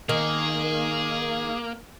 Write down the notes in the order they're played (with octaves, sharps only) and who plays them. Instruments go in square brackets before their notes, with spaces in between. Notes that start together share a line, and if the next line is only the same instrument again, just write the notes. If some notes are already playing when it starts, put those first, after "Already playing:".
[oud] D#3 [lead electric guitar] A#3 [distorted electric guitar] G#4